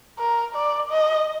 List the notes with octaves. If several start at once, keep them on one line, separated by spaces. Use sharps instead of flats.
A#4
D5
D#5